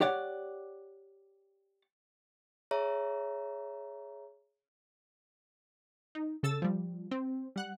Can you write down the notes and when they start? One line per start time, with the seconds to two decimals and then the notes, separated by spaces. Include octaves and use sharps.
0.01 G4 C#5 D5 F#5
2.71 G#4 C#5 E5 A#5
6.15 D#4
6.43 C#3 A4 E6 A6
6.62 F3 G3
7.11 C4
7.56 G3 F#5 F#6